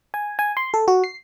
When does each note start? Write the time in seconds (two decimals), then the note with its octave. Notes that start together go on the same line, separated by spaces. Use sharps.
0.14 G#5
0.39 G#5
0.57 C6
0.74 A4
0.88 F#4
1.04 C7